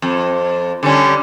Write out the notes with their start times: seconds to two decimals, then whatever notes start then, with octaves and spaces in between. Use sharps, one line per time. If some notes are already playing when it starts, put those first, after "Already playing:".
0.02 F2
0.83 D3 G3 C#4